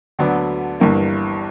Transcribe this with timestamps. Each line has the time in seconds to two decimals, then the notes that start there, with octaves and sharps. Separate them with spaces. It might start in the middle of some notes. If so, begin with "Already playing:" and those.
0.19 D2 D3 F#3 B3 D4
0.80 G1 G2 E3 A#3